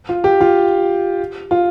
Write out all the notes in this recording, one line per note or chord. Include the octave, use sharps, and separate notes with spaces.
F4
G4
F4
F4